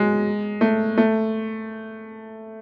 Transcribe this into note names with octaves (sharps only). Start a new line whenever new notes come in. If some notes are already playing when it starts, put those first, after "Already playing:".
Already playing: F#3 G#3
A3
A3